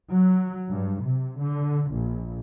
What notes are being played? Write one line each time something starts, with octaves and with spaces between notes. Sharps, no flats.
F#3
G2
C3
D3
A#1